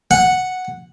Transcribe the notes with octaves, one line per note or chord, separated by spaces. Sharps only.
F#5